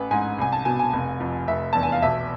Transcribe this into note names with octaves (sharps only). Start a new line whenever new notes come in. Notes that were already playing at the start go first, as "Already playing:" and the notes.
Already playing: A1 B4
G#2 G#5
C2 G#5
A5
B2 G#5
G#5
F1
F2
F1 E5
E2 A5
G#5
F5
B1 E5